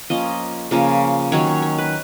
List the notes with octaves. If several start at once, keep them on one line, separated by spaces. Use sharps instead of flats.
F3 A#3 C#4 D#5
C#3 F3 A#3 C#4
D#3 F#3 C#4 C#5
C#5
C#5
B4